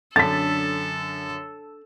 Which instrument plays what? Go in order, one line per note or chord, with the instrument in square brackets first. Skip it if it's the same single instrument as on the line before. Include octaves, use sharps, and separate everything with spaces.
[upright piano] F#2 D3 [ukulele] D4 [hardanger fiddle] A4 [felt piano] A6 B6